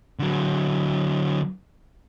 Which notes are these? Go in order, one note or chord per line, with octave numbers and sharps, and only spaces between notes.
D3 F#3